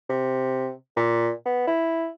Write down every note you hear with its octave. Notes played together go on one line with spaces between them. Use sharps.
C3
A#2
B3
E4